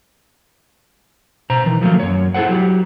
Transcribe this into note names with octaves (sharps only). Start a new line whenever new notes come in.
B2 C5 A#5
D#3 E3
F3 F#3 A3 A#3
F#2 C#5
E4 G#4 A4 C5 F#5
F#3 G4